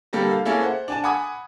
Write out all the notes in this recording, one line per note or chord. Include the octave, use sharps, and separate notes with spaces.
D3 G3 A#3 A4
F5
A#3 C#4 E4 G#4 A4
C5 F#5
D4 G#5 A5
F#5 G#5 B5 D6 D#6 G#6